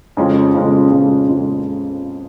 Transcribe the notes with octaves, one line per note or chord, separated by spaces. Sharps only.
F2 C#3 G#3 C#4 F4
F2 C#3 G#3 C#4 F4
F2 C#3 G#3 C#4 F4
F2 C#3 G#3 C#4 F4